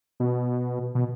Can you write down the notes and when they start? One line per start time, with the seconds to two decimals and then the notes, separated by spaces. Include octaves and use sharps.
0.20 B2
0.95 B2